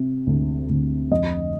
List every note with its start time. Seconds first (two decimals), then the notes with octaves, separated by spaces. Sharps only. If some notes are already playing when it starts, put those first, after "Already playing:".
Already playing: C3
0.27 D2
0.69 D2
1.11 F2 D#5